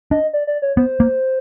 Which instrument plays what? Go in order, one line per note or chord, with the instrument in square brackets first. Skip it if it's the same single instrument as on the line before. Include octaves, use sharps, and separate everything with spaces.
[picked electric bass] D4 [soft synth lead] D#5
[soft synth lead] D5
D5
C#5
[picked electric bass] B3 [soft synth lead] C5
[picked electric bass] A#3